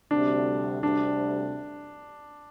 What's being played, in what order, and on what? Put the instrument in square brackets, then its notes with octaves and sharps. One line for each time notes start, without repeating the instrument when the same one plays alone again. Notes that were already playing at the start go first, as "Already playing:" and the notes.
[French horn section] D2 C3 G3 [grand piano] D4
[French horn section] D2 C3 G3 [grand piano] D4